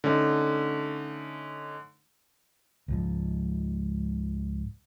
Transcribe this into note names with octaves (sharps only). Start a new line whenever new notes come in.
D3 A3 C#4 D#4
C#2 G#2 F3